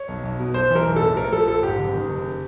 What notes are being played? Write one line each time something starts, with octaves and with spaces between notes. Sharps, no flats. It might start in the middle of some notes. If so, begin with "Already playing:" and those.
Already playing: C#5
B1
B1
B2
B1 C5
E3
A#4
B1
A4
A2
A#1 A#4
F3 A4
A#1 A4
G#2 G4
F#1
D#3
F#1